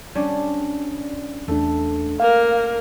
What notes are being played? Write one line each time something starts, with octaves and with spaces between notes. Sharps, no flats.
G3 C#4 D4
E2 A3 D4
A#3 A#4 F5